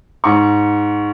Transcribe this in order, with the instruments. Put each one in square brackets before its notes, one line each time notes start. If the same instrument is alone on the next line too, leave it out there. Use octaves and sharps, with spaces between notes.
[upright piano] G#2 C#6